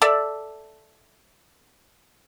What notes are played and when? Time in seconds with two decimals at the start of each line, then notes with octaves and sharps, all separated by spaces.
0.02 A4 D5 E5